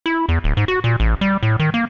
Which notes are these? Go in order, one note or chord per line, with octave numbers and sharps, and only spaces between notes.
E4
E2
D1
G#2
F#4
A#2
A1
G3
A2
D#3
A#3